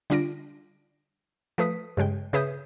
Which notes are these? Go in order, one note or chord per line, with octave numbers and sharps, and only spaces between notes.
D3 G3 D4 F4 A#6 D7
F3 A3 B4 D#6 B6
G2 C#3 G#3 G5
C#3 G#4 B4 E5 D#6 G6